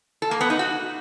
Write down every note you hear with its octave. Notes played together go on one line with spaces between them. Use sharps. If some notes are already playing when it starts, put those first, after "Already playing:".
A4
A#3
B3
D#4
F#4